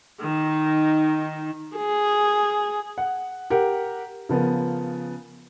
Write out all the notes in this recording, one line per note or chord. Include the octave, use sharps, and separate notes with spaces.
D#3 D#4
G#4
F#5
G4 A#4 F#5
C#3 F3 B3 A#4